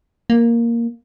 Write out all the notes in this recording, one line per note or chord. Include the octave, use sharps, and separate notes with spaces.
A#3